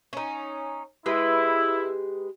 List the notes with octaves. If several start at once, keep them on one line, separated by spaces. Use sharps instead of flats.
C#4 D#4
G#3 E4 G4 B4